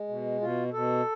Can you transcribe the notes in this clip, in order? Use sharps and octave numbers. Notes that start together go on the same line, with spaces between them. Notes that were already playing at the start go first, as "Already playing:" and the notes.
Already playing: G#3
B2
B2 F4
B2 A4